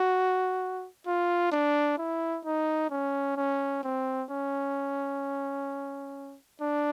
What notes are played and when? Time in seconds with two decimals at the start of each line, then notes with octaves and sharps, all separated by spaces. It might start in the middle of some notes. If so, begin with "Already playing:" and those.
Already playing: F#4
1.07 F4
1.52 D4
1.98 E4
2.45 D#4
2.91 C#4
3.37 C#4
3.83 C4
4.30 C#4
6.61 D4